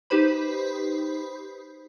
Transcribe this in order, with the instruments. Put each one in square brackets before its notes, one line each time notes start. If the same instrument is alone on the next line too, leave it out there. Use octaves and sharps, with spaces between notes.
[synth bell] D#4 G4 B4 C5 B5